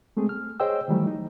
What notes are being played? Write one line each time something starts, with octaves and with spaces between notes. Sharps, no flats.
G#3 A3 C4 G#4
F6
G#4 C5 C#5 D#5 G5 E6
D#3 E3 F#3 G3 A3
D#4